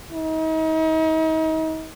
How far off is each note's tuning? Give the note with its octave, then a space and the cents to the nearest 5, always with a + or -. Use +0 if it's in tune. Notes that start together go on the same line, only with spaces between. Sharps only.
D#4 +40